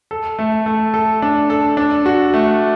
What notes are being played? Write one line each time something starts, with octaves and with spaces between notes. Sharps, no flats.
A4
A3
A3
A4
D4
A4
D4
F#4
A3